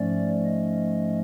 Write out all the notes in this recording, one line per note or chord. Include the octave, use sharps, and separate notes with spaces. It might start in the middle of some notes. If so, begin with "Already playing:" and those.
Already playing: G#2 F3 A3 C#4 D5
D#5